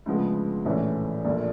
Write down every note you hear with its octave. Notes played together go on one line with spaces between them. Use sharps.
D2 C#3 F3 G#3 B3
A#1 A2 E3 A3 C#4
A#1 A#2 F3 A3